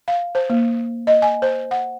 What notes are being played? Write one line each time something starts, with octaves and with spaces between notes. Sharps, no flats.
F5
C5
A#3
D#5
G#5
C5
F#5